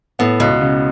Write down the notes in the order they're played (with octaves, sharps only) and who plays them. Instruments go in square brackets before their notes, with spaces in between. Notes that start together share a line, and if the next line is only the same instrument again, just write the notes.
[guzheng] A2 [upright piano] B3
[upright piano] C#2 [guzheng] B2
[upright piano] C#3